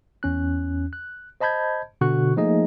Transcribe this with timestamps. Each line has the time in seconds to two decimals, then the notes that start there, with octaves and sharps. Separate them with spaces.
0.23 E2 C#4 F#6
0.93 F#6
1.41 C5 D#5 A5 B5 G6 G#6
2.01 B2 D3 F#4 C#6 F#6
2.36 F3 A3 A#3 D#4 G#4 D#5